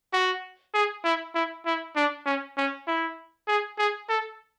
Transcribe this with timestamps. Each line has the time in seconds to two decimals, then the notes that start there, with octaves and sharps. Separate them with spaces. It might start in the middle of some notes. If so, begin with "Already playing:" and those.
0.13 F#4
0.74 G#4
1.04 E4
1.35 E4
1.66 E4
1.96 D4
2.26 C#4
2.57 C#4
2.87 E4
3.48 G#4
3.78 G#4
4.09 A4